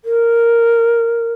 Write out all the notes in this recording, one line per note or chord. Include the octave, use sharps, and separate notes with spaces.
A#4